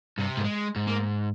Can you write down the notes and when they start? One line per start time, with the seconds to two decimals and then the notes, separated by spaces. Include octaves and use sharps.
0.18 G2 C3
0.37 G#2 A#3
0.44 G#3
0.76 G#2
0.87 A#3